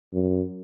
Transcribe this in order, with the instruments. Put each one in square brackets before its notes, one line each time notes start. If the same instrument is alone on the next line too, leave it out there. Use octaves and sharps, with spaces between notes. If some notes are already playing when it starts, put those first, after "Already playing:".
[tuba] F#2